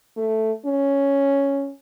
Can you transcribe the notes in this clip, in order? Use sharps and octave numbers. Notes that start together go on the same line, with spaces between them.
A3
C#4